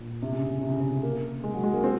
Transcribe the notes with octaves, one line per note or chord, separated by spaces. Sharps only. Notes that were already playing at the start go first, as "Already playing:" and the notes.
Already playing: A#2
C3
C#3
C3
C#3
C3
C#3
C3
A#3
G#3
F#3
G#3
A#3
C4